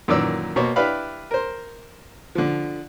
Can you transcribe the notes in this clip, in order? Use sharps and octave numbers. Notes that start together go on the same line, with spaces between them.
F#2 A#2 D#3 E3 D5 E6
B2 A#3 C5 C#5
D4 E4 G4 B4 F5 B5
A#4 C5
D3 F3